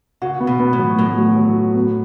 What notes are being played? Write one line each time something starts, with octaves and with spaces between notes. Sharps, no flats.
C#3 F#4
B3
B2
B3
A2
F#3
A2 F#3
F#3
F#3
F#4
B3